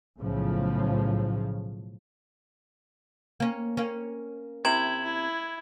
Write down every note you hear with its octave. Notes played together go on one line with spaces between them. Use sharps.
B1 A2 C#3 F3
A#3 C#4
A#3 C#4
C3 E4 G5 G#6 E7 F#7
E4